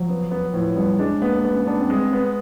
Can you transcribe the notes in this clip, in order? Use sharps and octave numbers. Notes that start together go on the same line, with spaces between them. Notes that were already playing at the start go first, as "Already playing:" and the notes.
Already playing: F3 F#3
B3
B3
A2 F3
G3 B3
G#3 D4
A#3 B3
B3
C#4
B3 D4
C4
G#3
B3